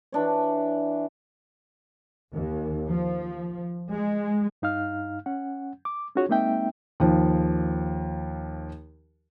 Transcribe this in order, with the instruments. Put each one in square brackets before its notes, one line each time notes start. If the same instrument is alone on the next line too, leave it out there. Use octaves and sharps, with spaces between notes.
[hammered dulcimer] E3 D4 C#5
[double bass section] D#2
F3
G#3
[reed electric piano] G2 D#4 F5 F6
C#4 F#5
D6
C#4 D#4 F4 F#4 G#4 C#5
G#3 A#3 C4 D#4 E5 G5
[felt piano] D#2 F3